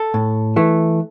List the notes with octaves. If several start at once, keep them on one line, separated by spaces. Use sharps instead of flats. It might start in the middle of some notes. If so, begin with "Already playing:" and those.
Already playing: A4
A2
E3 A3